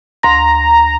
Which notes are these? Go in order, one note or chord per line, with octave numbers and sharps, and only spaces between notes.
D2 A#5 C6 A#6